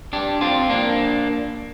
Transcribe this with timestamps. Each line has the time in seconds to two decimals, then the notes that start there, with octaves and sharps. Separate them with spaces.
0.13 D4 G4
0.41 C4 F4
0.70 A#3 D4